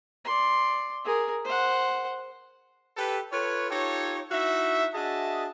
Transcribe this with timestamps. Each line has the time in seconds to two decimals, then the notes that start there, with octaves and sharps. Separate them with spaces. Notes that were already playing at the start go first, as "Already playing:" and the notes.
0.25 D5 C6
1.05 G#4 A#4
1.45 C5 F#5
2.97 G4 A4 B4
3.31 F4 A4 B4 C#5
3.70 D#4 F4 G4 A4 C#5
4.32 D#4 E4 F#4 E5
4.94 D4 F#4 G#4 D#5 E5 A5